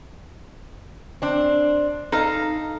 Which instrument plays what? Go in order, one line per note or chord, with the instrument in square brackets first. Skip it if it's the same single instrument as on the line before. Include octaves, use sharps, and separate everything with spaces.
[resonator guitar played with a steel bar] C4 D4
[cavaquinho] D#4 F5 A#5 [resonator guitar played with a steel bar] A4